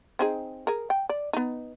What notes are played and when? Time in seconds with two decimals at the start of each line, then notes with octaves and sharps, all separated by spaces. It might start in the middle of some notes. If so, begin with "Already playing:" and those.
0.19 C4 D#4 G#4
0.67 G#4 A#4
0.90 G5
1.09 D5
1.33 B3 D#4